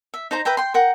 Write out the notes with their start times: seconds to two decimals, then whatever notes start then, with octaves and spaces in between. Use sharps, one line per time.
0.14 E5
0.31 D#4 C5 A#5
0.45 B4 E5 G5 A#5
0.57 G5 C6
0.74 A#4 F#5 G5